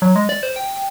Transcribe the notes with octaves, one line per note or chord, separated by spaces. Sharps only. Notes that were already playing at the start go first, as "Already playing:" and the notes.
F#3
G#3
D5
C5
G5